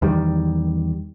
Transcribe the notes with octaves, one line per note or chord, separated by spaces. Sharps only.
E2 D#3 G3